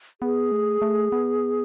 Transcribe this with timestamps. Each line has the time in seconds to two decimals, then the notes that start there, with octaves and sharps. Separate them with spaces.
0.21 B3 G#4
0.52 A3
0.82 A3
1.12 B3